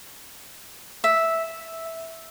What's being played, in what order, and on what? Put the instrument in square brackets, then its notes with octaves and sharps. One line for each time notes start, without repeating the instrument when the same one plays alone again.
[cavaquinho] E5